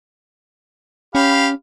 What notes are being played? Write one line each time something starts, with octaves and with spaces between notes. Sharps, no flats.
C#4 G4 F5 B5